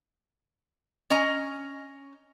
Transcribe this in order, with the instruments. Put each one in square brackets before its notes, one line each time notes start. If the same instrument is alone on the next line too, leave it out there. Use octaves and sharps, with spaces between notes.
[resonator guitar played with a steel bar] C#4 D#5 G#5 A#5